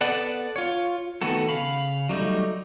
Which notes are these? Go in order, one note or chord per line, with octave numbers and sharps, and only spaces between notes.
B3 A4 D5 F#5
F4 C#5
D#3 A3 B3 F#4 A4
C#3 F5 B5
F#3 G3 A3 D#4